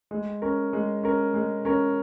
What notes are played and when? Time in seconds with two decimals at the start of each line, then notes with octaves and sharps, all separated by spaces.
0.11 G#3
0.42 C#4 A#4
0.73 G#3
1.03 C#4 A#4
1.34 G#3
1.65 C#4 A#4